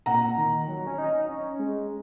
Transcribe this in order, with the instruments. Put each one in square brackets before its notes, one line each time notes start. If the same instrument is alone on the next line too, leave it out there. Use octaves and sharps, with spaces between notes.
[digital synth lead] A#2 [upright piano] F#5 A#5
[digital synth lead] D#3
F#3
C#4
D#4
C#4
G#3